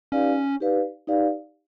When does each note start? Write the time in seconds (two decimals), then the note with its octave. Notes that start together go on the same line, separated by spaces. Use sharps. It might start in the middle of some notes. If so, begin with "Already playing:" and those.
0.12 C#4 D#4 G4 B4 D5 F5
0.60 D#4 G4 B4 D5 F5
1.07 D#4 G4 B4 D5 F5